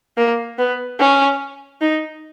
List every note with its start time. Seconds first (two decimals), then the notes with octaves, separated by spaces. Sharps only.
0.17 A#3
0.58 B3
0.99 C#4
1.81 D#4